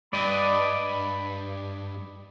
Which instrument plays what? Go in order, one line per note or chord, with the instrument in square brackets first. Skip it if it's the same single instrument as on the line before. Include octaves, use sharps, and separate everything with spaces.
[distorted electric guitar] G2 [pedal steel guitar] D5 D#5 [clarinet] B5